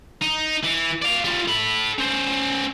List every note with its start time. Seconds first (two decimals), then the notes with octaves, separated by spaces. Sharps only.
0.22 D#4
0.64 E3
1.02 D5 F5
1.25 G3 F4
1.48 A4 B5
1.98 C#4 C5